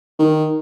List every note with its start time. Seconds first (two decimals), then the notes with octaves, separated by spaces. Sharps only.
0.19 D#3